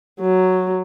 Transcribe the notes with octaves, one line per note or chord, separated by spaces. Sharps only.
F#3